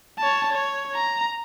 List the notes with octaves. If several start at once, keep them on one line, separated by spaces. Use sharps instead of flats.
C#5 A5
C#5
A#5